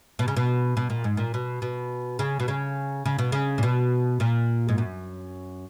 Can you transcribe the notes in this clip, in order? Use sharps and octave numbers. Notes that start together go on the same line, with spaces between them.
B2
C#3
B2
B2
A#2
G#2
A#2
B2
B2
C#3
B2
C#3
C#3
B2
C#3
A#2
B2
A#2
G#2
F#2